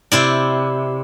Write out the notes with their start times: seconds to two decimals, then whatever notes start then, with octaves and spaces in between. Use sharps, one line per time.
0.12 C3 E4 D5